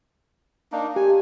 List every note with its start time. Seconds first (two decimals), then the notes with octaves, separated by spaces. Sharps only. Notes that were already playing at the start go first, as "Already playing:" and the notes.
0.72 A#3 D4 D#4
0.96 G4 G#5